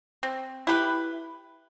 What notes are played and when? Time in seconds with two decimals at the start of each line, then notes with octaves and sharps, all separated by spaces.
0.23 C4
0.67 E4 G4 B4